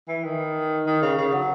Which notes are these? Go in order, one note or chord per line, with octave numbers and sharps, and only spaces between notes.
E3
D#3
D#3
C#3
C#3
F#3